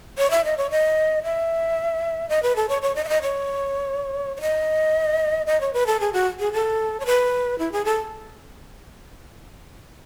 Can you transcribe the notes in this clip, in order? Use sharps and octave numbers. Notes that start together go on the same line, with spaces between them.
C#5
E5
D#5
C#5
D#5
E5
D#5
B4
A4
C#5
C#5
D#5
E5
D#5
C#5
C#5
D#5
D#5
C#5
B4
A4
G#4
F#4
G#4
A4
C#5
B4
E4
G#4
A4